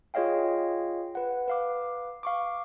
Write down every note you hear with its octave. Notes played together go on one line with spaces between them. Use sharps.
F4 G#4 C#5 D#5 F5 G5
B4 F#5
B4 F5 D6
F5 C#6 D6